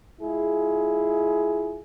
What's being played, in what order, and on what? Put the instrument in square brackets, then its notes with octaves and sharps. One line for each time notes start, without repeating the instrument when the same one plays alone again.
[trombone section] G#3 E4 F4 G#4